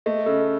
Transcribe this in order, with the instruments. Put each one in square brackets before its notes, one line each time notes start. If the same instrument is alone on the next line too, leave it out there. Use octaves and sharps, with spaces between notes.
[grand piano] A3 [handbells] D#5
[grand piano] C#3 [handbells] A4